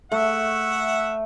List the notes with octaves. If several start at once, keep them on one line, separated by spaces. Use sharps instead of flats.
A3 E5 F#5